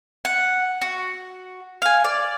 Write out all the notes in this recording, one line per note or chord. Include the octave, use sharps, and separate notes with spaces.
F#5
F#4
F5 G#5
D5